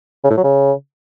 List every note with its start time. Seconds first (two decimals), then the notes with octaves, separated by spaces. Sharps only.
0.24 C#3
0.31 A2
0.37 F#3
0.44 C#3